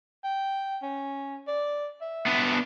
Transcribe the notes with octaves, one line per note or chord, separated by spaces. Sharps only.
G5
C#4
D5
E5
B3 D4